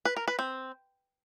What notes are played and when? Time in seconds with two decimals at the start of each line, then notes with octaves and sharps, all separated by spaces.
0.05 B4
0.16 A#4
0.28 B4
0.39 C4